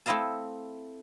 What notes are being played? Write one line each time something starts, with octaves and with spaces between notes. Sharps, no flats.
A3 C4 E4 D#5 F5 A5